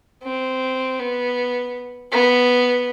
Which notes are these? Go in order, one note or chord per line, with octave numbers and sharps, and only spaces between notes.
C4
B3
B3